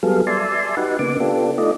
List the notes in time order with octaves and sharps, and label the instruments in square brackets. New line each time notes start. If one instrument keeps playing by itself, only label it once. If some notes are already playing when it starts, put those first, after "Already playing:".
[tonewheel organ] F#3 G3 B3 G#4 A4 F5
D5 E5 G#5 A5 C6
D#4 F#4 G4 B4 F#5
C#3 A#3 B3 D6
B3 D4 F4 G4 A4
A3 D#4 F4 D5 D#5